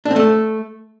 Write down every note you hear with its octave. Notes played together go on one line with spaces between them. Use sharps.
D4
C4
A3